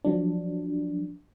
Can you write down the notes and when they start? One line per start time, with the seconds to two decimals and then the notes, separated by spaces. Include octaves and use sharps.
0.05 F3 F#3 D4